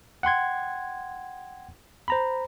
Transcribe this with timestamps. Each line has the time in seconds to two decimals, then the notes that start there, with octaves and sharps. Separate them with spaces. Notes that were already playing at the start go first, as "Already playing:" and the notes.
0.23 F#5 G5 C6 G#6
2.08 C5 A#5 B5